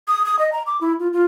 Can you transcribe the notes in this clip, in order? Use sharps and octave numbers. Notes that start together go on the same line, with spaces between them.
D#6
D#6
D#5
A#5
D6
E4
F4
F4